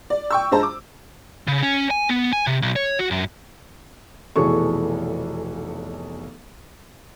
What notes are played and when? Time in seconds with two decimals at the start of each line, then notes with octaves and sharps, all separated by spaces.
0.10 D5
0.30 G5 C#6 E6
0.51 G2 G#3 C5 A5 A#5
0.63 D6
1.48 C#3
1.63 C#4
1.90 G#5
2.09 B3
2.33 G#5
2.47 C3
2.62 B1
2.76 C#5
2.99 F#4
3.11 F#2
4.36 F1 B1 E3 G#4 A4 C#6